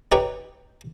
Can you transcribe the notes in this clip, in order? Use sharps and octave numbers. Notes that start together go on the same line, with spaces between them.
D#4 G4 B4 C#5 G5